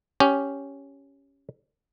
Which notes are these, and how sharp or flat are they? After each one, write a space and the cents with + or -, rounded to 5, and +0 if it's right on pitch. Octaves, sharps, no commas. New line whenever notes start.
C#4 +0 G4 +0